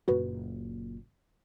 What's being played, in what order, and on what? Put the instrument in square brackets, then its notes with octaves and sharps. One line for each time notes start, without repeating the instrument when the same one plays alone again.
[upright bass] F#1 A#2 [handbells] F#4 B4